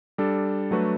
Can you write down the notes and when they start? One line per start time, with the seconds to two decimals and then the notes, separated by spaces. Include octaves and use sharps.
0.18 G3 D4 A4
0.71 F#3 A3 D4 F#4 B4